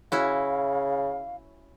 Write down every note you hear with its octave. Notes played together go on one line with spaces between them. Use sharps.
C#3 C#4 E4 F#4 F5